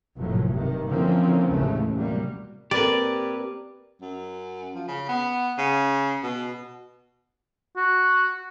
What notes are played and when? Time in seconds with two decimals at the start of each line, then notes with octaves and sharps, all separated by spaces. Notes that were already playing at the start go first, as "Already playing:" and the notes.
0.16 F1 D#2 A2 F3 F#3
0.49 G2 C3 D#3
0.87 D3 E3 F3 A#3 C4 C#4
1.48 A1 D#2 C#3 E3 G#3 A3
1.93 C3 F#3 G3 A#3
2.71 A#3 C4 G4 A#4 B4 D5
4.01 F#2
4.75 F3
4.88 C#3
5.09 B3
5.58 C#3
6.23 B2
7.76 F#4